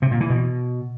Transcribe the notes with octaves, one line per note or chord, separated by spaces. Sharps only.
C3
A#2
E3
B2